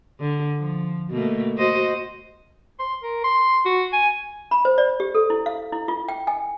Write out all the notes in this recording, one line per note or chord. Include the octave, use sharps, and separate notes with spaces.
D3
F3
B2 A3 A#3
F#4 C5 D#5
C6
A#4
C6
F#4
G#5
B5
C5
D5
G4
A4
E4
F5
E4
F4
G5
G#5